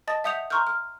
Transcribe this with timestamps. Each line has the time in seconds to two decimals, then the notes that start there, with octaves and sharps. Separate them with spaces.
0.08 D#5 A5 D#6 A6
0.24 E5 F#5 D#6 G6 C#7 F7
0.50 A#5 C6 C#6 E6 F6 G6
0.67 F6